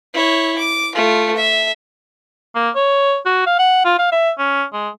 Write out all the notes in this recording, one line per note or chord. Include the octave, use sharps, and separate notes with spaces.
E4 C#5
D6
A3 F4
E5
A#3
C#5
F#4
F5
F#5
F4
F5
E5
C#4
G#3